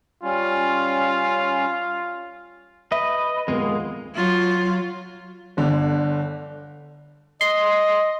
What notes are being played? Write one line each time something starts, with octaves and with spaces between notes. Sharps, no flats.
G3 C#4 F4
B4 D#5 E5
D#1 F2 G#3 A#3 B3 F4
F#3 F4
G1 D3
D#5 C6